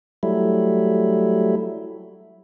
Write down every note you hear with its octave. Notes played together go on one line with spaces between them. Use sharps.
F#3 G3 A3 E4